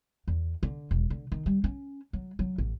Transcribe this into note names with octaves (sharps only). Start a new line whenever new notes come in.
E2
D3
E1
D3
D#3
G3
C#4
F#3
F#3
A1